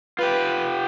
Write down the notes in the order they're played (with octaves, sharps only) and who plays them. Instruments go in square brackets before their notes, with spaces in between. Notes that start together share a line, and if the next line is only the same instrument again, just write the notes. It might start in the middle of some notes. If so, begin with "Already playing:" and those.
[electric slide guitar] F4 G4 [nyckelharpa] B4